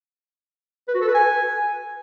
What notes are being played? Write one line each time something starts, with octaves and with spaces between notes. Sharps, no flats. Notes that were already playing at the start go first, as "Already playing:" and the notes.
B4
F#4
A4
B4
G#5